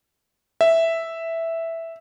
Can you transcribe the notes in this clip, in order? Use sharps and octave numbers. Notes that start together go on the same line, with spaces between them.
E5